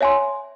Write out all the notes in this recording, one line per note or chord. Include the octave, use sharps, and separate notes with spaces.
C#5 E5 G#5 C6